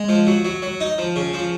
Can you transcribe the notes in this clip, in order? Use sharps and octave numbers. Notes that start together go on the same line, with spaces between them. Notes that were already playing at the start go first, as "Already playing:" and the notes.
Already playing: G#3
F3
F#3
F#3
F#3
D#4
F3
C#3
F3